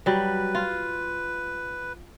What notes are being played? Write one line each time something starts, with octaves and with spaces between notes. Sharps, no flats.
F#3 G3 B4
F4